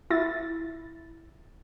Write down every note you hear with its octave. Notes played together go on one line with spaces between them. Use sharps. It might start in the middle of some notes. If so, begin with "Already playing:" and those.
E4 A6